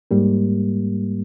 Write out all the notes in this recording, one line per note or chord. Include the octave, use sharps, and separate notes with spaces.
G#2 G3 A#3